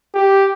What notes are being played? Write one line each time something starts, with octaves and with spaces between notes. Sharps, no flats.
G4